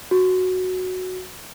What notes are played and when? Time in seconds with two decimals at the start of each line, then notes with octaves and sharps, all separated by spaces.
0.11 F#4